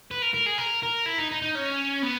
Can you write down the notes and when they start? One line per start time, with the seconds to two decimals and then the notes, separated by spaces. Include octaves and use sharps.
0.11 B4
0.22 A#4
0.34 A#4
0.46 G#4
0.58 A#4
0.83 A#4
1.06 E4
1.18 D#4
1.31 D#4
1.42 D#4
1.55 C#4
2.02 B3